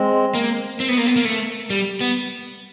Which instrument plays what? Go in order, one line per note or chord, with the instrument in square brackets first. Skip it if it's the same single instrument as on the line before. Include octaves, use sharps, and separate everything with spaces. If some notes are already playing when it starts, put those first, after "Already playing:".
Already playing: [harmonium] G#3 C4
[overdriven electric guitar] A#3
C4
B3
A#3
B3
A#3
A3
G3
B3